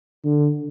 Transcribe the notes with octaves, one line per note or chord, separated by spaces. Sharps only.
D3